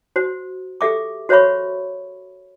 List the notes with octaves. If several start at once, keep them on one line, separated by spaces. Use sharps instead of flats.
F#4 C5
G4 A4 E5 D6
F#4 C5 C#5 E5 B5 C#6